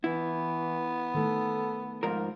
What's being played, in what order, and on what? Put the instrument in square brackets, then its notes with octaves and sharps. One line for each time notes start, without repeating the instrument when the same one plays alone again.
[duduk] E3 [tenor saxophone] B3 [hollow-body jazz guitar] E4
[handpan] D#3 A3 [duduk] A4
[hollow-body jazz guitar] G#2 F3 A#4 [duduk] F4